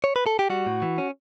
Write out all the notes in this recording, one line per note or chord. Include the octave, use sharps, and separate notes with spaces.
C#5
B4
A4
G4
G3 F#4
A2
E3
C#4